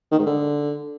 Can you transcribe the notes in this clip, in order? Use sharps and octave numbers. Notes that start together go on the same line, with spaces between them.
D#3
G#2
D3